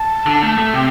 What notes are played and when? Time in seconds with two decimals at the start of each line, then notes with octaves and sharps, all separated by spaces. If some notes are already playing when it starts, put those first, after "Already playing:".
Already playing: A5
0.26 D3
0.42 A3
0.58 A3
0.74 C3 G5